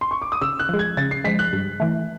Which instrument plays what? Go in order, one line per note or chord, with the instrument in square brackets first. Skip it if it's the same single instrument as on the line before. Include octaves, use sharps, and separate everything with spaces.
[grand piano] C6
C#6
D6
D#6
[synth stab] C#3 [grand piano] E6
[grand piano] F#6
[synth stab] F3 G#3
[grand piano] G#6
[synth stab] C#3 [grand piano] A6
[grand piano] C7
[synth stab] F3 G#3 [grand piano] B6
[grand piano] F#6
[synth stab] G2
E3 A3